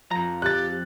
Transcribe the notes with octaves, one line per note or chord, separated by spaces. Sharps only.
F2 F3 A#5
G4 F#6 A6